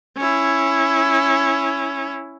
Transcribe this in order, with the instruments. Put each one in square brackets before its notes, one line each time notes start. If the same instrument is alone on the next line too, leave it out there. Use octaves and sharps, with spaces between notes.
[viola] C#4 E4